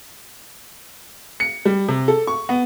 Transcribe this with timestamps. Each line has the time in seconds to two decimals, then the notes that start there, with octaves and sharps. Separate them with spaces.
1.40 C#7
1.65 G3
1.88 C3
2.08 A4
2.27 C#6
2.49 B3